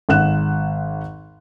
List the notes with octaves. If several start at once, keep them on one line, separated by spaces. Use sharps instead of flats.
G#1 F#5 F#6 E7